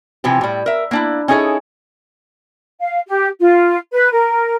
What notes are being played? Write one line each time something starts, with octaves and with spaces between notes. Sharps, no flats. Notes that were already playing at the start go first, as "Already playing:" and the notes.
C3 E3 F3 G4
A2 G3
A#4 E5
A#3 D4 E4
C#4 D#4 E4 G#4 A4 C#5
F5
G4
F4
B4
A#4